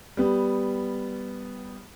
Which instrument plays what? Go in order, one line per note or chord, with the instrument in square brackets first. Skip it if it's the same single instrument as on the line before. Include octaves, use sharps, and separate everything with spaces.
[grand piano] G3 B3